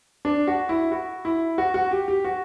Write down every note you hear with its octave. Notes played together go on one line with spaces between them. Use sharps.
D4
F#4
E4
F#4
E4
F#4
F#4
G4
G4
F#4